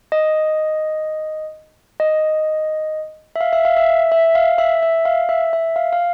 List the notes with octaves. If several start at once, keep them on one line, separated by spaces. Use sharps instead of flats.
D#5
D#5
E5
F5
E5
F5
E5
E5
F5
E5
E5
F5
E5
E5
F5
F5